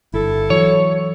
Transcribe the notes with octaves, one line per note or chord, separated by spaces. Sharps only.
G1 E4 A4
E3 F#3 C#5